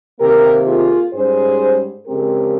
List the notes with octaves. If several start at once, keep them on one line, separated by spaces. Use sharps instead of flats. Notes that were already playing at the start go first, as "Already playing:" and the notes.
C3 D#3 A#3 G4 A#4
F4 G#4
G#2 G3 C#4 G#4 C5
F2 C#3 G#3 C4 G4 A#4